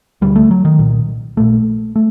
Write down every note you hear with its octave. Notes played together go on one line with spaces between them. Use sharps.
D2 D3 G3
A3
F#3
D#3
C2 A#2
A#1 A#2 A3
A3